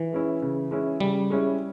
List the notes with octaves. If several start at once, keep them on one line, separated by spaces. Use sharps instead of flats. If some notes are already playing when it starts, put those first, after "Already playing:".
Already playing: E3
G#3 C#4 E4
C#3
G#3 C#4 E4
C#3 G3
G#3 C#4 E4